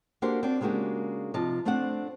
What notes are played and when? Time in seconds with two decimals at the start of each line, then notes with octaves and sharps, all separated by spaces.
0.22 A#3 D4 F#4 G4 A4 C5
0.43 C4 D4 D5
0.61 C#3 G#3 A#3 D4 F#4 G4
1.34 C3 F3 D#4 D#5 A5
1.65 A3 C4 D4 C5 F#5